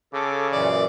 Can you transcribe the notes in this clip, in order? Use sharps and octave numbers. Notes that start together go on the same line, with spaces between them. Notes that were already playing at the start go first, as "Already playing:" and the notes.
C#3 A4 D6
F#2 A#2 E3 D5